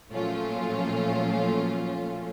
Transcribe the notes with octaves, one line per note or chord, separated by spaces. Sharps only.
A#2 F3 F#3 A3 C#4 F4